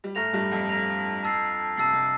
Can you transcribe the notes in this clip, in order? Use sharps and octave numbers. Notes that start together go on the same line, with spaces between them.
G3
A2 A3 A#5 F6 A#6 F7
G2 G3
F2 F3
A#5 F6 A#6 F7
A5 E6 A6 C7
C3 A5 E6 A6 C7
C3